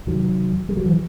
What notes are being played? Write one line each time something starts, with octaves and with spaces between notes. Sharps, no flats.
E2 C3 D#3 F#3
G3
F#3
E3